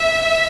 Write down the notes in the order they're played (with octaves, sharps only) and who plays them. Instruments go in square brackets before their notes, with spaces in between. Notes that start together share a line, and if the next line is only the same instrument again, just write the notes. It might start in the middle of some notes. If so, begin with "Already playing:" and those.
Already playing: [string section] E5